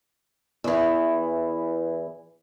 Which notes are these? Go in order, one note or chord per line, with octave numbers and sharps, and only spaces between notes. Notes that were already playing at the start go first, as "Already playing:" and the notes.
E2 E3